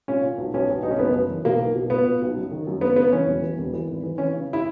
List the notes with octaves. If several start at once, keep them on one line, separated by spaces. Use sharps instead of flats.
A#2 C#4
A#2
B1
B1 C#4
B1
B1 D#4
C#4
F#1 B3
F#2
E3
B2 A#3
B1
B2
A#2 B3
A#2
B1
F#2
D#3
F#2
C#3 B3
C#3 B3
E3 C#4
E1
E3
E1
E3
G#1
E3
E3 C#4
C#3
E4